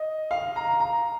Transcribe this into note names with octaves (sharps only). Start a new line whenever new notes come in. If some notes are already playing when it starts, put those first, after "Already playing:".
Already playing: D#5
F5
A#5
A#5